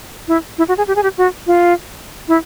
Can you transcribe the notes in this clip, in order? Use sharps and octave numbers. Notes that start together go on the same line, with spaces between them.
E4
E4
F#4
G#4
G4
G#4
G4
F#4
F4
E4